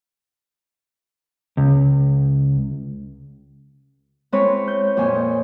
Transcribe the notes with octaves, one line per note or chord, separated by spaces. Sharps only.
C#2
G#3 C4 E4 B4 C#5
G6
F2 A#2 C#5 G#5
D#5